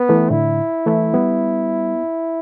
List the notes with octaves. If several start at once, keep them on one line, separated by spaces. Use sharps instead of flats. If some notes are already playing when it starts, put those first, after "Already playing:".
Already playing: B3
E3 A3
A2 D3 E4
E3 A3
G3 B3